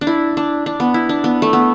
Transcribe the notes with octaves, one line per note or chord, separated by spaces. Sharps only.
D4
E4
D4
D4
B3
E4
D4
B3
A3
B3